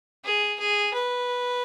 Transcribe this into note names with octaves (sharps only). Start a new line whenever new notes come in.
G#4
G#4
B4